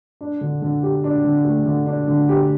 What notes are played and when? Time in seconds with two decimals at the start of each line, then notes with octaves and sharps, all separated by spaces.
0.21 D4
0.41 D3
0.62 D3
0.83 G4
1.04 D4
1.24 D3
1.45 A3
1.66 D3
1.86 D4
2.08 D3
2.29 G4